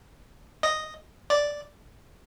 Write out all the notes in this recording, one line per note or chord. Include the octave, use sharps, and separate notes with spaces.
D#5
D5